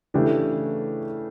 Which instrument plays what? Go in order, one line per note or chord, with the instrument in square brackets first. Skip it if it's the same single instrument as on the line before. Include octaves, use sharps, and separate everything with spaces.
[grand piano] C#3 E3 A3 D4 G4